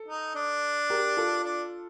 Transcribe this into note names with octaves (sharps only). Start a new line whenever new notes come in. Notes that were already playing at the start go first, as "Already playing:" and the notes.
Already playing: A4
D#4
D4
G4 A#4
F4 A4
D4